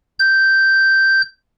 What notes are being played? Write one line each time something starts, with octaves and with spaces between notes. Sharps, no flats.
G6